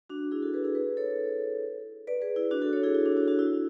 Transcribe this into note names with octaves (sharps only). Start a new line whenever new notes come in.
D4 F#4
E4 G#4
F#4 A4
G#4 B4
E4 G#4
G#4 B4
A4 C#5
B4 D5
G#4 B4
E4 G#4
D4 F#4
F#4 A4
A4 C#5
E4 G#4
E4 G#4
D4 F#4
D4 F#4
D4 F#4
E4